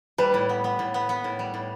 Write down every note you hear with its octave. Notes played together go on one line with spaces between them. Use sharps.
G3 B4
A2
B3
B3
A2
B3
B3
A2
G3
A2